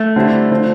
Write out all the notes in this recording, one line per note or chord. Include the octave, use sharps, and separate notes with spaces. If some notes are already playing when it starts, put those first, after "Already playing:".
Already playing: A3
D3 G3 C4 E4
D3 F3 C4